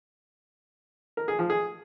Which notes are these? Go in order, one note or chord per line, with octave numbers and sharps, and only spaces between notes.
A#4
G#4
F3
G#4